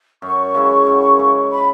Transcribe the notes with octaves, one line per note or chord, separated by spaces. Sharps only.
F#2 C#6
C#3 G#3 E4
F#2
C#3 G#3 E4
B5